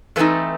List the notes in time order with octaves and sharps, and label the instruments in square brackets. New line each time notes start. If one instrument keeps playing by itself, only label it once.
[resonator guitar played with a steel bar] A2 E3 A3 C4 D#4 A4 B4